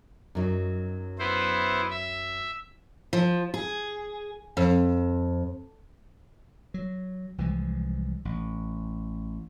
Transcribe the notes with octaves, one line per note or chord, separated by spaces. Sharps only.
F#2 F#3 D#4
B3 E4 C5
E5
F3
G#4
F2
F#3
C2 E3 F3 G#3
A1